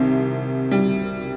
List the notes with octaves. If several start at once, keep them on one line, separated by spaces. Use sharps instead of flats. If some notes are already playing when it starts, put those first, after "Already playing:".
Already playing: C2 C3 D#3
G3